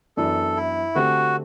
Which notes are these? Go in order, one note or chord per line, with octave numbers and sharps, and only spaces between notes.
F#2 E3 B3 D4 A4
E4
D3 A3 C4 F#4 G4